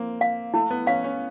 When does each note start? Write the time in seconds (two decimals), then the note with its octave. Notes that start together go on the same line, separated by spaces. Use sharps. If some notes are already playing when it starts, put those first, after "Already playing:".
Already playing: A#3 C4
0.21 F5
0.54 A3 E4
0.71 B3
0.87 C#4 F5
1.04 C#4